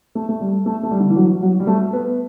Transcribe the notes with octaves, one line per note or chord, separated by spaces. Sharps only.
A3
A3
G3
A3
A3
G3
D3
E3
F#3
F#3
G3
A3
B3